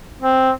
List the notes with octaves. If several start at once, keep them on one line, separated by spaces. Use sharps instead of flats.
C4